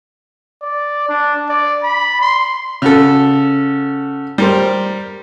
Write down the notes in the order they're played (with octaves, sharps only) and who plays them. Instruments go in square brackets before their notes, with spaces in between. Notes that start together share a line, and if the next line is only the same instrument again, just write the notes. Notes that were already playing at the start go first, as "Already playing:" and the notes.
[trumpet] D5
D4
D5
B5
C6
[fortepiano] C#3 F#4 A4
G3 A#4 C5